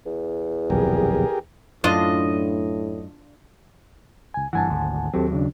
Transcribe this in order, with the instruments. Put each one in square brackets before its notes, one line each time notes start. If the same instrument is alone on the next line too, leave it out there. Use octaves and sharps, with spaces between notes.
[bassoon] E2
[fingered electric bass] D#1 B1 F2 [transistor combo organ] G4 G#4 A#4
[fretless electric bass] F#2 [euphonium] A2 [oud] D4 F4 [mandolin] D#5
[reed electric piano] C#2 G#5
[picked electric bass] F#1 G2 E3 [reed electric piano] F#5 G#5 A5
[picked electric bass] G#1 D2
[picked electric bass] D#2 F#3 [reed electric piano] C4 G4 A4
[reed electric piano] C#3 D4